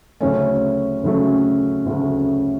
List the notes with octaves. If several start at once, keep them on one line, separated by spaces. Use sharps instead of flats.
D2 C#3 F#3 A3 C#4
D2 C#3 F#3 A3
D2 C#3 F#3 A3